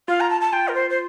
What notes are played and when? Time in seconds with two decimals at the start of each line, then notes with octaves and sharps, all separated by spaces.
0.08 F4 F5
0.20 A#5
0.30 A5
0.41 A5
0.53 F4 G5
0.68 A#4
0.75 C5
0.90 C5